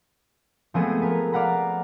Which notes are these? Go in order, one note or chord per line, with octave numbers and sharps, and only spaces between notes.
F3 G#3 A3 B3 C4 G#4
A#4 B4
D5 F5 F#5 A#5 B5